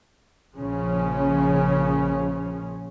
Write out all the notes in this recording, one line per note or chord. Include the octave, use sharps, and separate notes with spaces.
A#1 C#3 F3 C#4